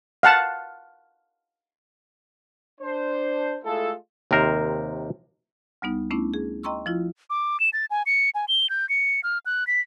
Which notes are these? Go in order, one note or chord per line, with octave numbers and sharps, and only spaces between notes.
F5 F#5 A5
D4 C5
G#3 A3 E4 F4 A4
D#2 C3 D#3 A#4 C5 A#5
D2 G3 B3 D#4
A3 B3 C#4 D4 E4
G#4
D#5 G5 A#5 C6 C#6 E6
F3 E4 F4
D6
E7
A6
G#5
C#7
G#5
G7
G6
C#7
F6
F#6
B6